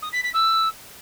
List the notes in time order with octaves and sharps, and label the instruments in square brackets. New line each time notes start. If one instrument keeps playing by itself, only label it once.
[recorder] D#6
B6
B6
E6